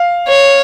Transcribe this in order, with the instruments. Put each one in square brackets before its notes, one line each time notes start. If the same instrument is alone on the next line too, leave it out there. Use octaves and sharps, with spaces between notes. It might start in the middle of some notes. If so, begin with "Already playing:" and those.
Already playing: [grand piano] F5
[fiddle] C#5